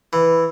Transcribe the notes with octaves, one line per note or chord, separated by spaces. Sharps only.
E3